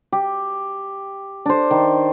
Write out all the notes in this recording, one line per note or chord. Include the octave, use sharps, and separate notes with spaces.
G4
D4 C5
D#3